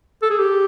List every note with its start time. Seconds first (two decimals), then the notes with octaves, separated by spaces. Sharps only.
0.23 A4
0.30 G#4
0.39 G4